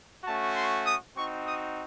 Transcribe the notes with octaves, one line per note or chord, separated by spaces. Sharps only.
A3 C#4 F#4 A5
C6
D#6
C4 D#4 F#4 C#6
D#6